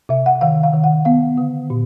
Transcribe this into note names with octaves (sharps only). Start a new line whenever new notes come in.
C3 E5
F#5
D#3 F5
F5
D#3
F#5
B3 F5
D3
A#2